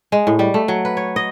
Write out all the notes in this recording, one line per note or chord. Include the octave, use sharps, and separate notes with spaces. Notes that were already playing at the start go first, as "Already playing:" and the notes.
G#3
A2
G3
A3
F#3
B4
C#5
D#5